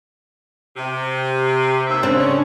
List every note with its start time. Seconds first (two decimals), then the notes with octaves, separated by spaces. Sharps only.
0.77 C3
1.87 D#2 E5
2.03 C#3 C4 D4
2.17 C#4